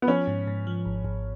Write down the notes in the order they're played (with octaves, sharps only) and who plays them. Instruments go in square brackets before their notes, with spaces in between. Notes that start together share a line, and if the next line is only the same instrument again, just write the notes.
[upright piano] B3
[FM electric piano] F3 [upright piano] C#4
[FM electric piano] G#2
G#2
F3
G#1
G#1